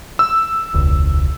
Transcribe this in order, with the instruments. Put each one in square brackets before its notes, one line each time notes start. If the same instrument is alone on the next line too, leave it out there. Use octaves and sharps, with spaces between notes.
[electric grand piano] E6
[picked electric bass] E1 C#2